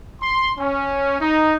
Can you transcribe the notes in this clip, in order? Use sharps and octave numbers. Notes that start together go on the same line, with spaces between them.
C6
C#4
D#4